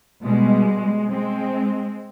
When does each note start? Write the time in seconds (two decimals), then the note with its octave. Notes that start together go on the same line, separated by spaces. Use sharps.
0.23 B2 G3 G#3
1.09 G#3 C4